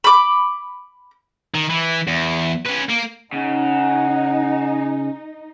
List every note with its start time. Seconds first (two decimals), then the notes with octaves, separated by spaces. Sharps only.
0.04 B5 D6
1.55 D#3
1.70 E3
2.08 E2
2.65 C#4 B4
2.89 A#3
3.33 C#3 D#4 F#5